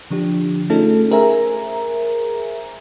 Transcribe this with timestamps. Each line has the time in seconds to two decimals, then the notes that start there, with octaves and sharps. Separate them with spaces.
0.10 D3 F3 D4 G4
0.70 A3 C#4 D#4 F4 G#4 A4
1.11 G#4 A#4 C5 E5 G#5 A#5